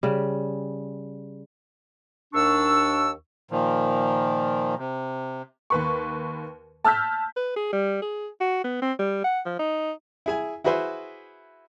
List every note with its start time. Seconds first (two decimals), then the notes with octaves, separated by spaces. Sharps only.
0.03 C#3 G3
2.34 D#2 D4 C#6 E6
3.51 A#2 D#3 F3
4.78 C3
5.70 D#2 B4 C#6
6.84 A5 E6 F6 G6 B6
7.36 B4
7.56 G#4
7.73 G3
8.02 G#4
8.41 F#4
8.64 B3
8.82 C4
8.99 G3
9.24 F#5
9.46 F3
9.59 D#4
10.26 E4 G#4 G#5
10.64 E4 F#4 G#4 B4 C5 E5